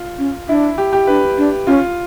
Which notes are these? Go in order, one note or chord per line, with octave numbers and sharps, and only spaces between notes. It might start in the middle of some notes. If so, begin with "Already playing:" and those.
Already playing: F4
C#4
D4 E4
G4
G4
D4 B4
D4
C#4 F4